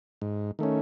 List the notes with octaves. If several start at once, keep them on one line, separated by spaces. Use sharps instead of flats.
G#2
D#3 A3 C#4